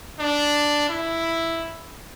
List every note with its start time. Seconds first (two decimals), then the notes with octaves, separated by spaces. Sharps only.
0.19 D4
0.89 E4